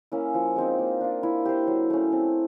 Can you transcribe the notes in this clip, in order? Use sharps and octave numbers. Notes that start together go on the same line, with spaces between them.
A#3 C#4 E4
F3
G#3 C4 D#4
A#3
D4 F4
E4
G4 C5
F#3
A3 C#4
C4